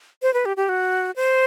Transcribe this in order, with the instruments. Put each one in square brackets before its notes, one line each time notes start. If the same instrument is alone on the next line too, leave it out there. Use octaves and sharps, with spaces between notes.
[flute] C5
B4
G4
G4
F#4
C5